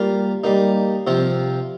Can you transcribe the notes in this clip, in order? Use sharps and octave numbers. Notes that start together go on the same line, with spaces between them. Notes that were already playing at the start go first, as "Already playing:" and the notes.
Already playing: G3 A#3 F4 A#4
G3 A#3 D#4
C3 F3 C4 F4